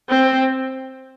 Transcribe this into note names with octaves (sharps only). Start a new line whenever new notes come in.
C4